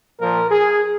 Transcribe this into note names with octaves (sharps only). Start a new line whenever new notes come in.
A#2 F3 A#4
G#4